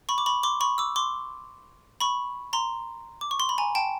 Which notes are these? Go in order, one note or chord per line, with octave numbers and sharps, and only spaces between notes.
B5 C#6
D6
B5 C#6
C6 D6
B5 C#6
D6 E6
C6 D6
B5 C#6
A#5 C6
D6
C#6
C6
B5
G#5 A#5
G5 A5